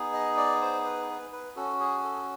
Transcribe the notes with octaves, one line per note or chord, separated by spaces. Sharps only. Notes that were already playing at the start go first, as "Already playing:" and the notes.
Already playing: B3 D#4 G#4
D#5
D5
C5
B4
B4
B4
C#4 F#4 A4
G#4
A4